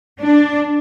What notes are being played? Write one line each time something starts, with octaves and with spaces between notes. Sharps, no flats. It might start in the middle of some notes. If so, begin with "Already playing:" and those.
D4